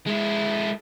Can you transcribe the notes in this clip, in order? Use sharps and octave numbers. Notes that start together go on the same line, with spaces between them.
G#3 E4